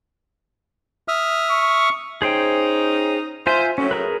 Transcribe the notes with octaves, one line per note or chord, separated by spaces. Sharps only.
E5 D#6 F6
C#6
C#4 D#4 G#4 C5 G5
F4 C5 E5 G#5
A2 F#3 C#4
G#4 A#4 B4